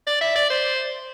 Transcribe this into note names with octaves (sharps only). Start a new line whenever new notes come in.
D5
E5
D5
C5